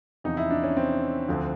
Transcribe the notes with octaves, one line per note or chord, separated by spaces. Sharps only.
E2 C3 F3 D#4
E4
D4
C#4
C4
D2 D3 F3